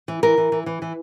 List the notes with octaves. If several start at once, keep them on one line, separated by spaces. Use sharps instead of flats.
E3
E3 A#4
E3
E3
E3
E3